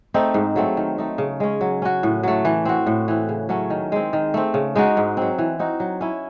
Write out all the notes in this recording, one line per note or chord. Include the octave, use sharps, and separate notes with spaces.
A3 C4 D#4
G#2
F#3 A3 C4
D#3
A3 D#4
C#3
G#3 C#4
F#3
C#4 F#4
A2
F#3 A3
E3
C4 F#4
A2
E3 C4
C#3
F#3 A3 C#4
D#3
G#3 C4
D#3
A3 C4
C#3
G#3 D#4 F#4
G#2
F#3 C4
E3
C4 D#4 F#4
F#3
C#4 E4